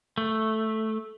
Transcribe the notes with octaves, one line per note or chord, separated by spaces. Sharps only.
A3